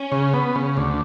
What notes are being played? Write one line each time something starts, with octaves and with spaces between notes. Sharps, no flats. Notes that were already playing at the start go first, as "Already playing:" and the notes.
Already playing: C#4
C#3
B3
C#3
D2